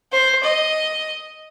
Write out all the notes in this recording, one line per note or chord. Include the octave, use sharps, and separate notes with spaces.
C5
D#5